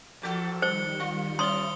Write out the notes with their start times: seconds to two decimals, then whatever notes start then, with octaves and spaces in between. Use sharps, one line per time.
0.22 A#2 F3 F#4 A4
0.62 D#3 G3 C5 C#7 G7
1.00 F4
1.39 C4 E4 C6 D#6 G7